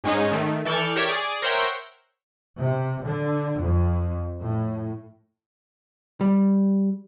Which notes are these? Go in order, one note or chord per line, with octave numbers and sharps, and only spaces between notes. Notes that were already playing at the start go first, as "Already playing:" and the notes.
G#2 G#3 C#4 D#4
D#3 A3
E3 A4 D5 C#6 F6 G6
G4 A#4 C#5 D5 E5
G#4 D5
A#4 C5 C#5 E5 F#5 G5
C3
D3
F2
A2
G3